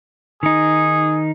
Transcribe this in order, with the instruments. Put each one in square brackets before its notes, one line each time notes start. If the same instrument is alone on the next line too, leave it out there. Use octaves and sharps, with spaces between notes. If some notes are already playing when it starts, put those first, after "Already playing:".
[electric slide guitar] D#3 D#4 [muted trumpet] G#4